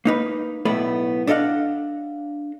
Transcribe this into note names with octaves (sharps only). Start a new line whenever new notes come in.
A#3 D#4 B4
B1 A2 A3 B3 D5 B5
D4 A4 D#5 F5 F#5